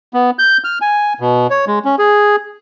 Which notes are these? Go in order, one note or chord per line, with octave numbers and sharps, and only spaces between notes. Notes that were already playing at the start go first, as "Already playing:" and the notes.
B3
G6
F6
G#5
B2
C#5
G#3
C#4
G#4